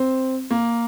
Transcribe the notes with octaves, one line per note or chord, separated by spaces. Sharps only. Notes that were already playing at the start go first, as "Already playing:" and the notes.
Already playing: C4
A#3